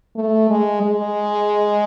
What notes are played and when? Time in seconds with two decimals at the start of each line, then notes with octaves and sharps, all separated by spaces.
0.16 A3
0.50 G#3
0.82 G#3